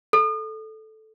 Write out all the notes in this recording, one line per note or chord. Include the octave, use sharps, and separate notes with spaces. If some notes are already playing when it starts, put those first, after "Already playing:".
A4